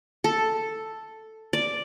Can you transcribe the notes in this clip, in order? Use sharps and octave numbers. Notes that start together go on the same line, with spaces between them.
A4
D5